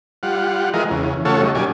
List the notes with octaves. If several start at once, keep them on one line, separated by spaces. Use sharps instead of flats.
G3 F4 F#5
E3 G#3 F4 A#4 D#5
E2 C#3
C#3 A3 F4 F#4 A4 C#5
F#3 G3 D#4
A#2 F#3 G3 C#4 D5 G#5